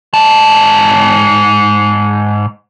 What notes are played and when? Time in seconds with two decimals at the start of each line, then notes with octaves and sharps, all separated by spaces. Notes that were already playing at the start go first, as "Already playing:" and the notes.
0.14 G#2 A5